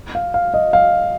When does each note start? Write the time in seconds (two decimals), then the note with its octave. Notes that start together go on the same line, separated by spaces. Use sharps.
0.15 F5
0.34 F5
0.54 D#5
0.73 F5